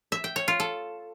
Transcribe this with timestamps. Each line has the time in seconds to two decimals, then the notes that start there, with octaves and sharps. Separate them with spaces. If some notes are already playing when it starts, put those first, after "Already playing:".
0.12 E5
0.24 G5
0.36 C#5
0.48 F4
0.60 A4